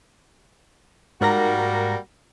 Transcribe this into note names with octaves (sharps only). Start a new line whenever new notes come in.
G#2 G3 A#3 F#4 A#4 A#6